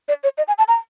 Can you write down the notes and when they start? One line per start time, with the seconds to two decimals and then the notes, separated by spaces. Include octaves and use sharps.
0.08 D5
0.23 C#5
0.38 D#5
0.48 G#5
0.58 A5
0.68 A#5